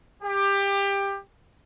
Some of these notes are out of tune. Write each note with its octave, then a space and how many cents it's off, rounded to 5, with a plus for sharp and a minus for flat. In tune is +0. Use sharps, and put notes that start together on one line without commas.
G4 +20